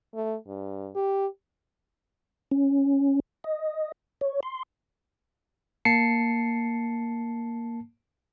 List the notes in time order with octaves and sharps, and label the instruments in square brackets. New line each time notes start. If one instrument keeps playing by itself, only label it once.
[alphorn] A3
G2
G4
[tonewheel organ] C#4
D#5
C#5
C6
[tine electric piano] A#3 A5 C7 C#7